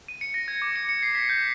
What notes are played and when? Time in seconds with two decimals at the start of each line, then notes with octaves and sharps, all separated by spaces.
0.08 D#7
0.21 C#7
0.34 A#6
0.48 G#6
0.62 D6
0.76 C#7
0.89 C#7
1.03 C7
1.15 B6
1.29 G6